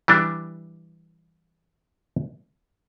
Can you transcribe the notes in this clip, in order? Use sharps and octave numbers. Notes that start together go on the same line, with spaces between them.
E3 G3 D4